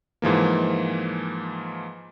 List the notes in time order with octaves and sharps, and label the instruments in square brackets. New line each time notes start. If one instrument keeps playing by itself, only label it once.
[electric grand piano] G#2 E3 F3 A#3